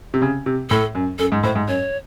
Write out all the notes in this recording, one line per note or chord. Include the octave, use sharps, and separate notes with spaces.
C3
C#3
C3
A2 A4
F#2
F#2 A4
G#2
A2 C5
G#2
F#2 C#5